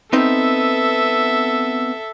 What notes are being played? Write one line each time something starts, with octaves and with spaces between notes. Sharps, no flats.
B3 C4 D#4 A4 E5